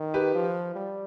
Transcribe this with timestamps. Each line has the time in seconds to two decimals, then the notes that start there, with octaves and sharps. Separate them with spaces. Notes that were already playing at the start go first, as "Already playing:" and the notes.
Already playing: D#3
0.14 G4 B4
0.35 F3
0.75 G3